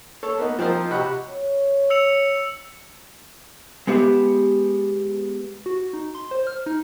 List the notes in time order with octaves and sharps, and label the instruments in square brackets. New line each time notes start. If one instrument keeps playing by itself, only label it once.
[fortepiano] A4 C#5
A#3 B3 D#4
F3 C4 D#4 F4 A#4
C3 D#4 F#4 G4 F#5 B5
[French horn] C#5
[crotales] E6 C#7 F7
[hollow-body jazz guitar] G#3 B3 G4 E5
[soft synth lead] F#4
D#4
C6
C5
F6
D#4